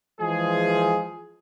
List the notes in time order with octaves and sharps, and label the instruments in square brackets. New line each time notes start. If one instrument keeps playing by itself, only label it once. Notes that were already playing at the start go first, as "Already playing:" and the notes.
[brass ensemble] E3 F3 G#3 G#4